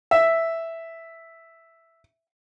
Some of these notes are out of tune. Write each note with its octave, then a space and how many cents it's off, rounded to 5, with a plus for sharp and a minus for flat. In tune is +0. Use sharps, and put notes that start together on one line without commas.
E5 +0